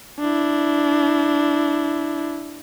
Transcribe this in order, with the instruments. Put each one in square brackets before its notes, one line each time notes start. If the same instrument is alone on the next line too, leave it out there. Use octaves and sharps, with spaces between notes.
[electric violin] D4 E4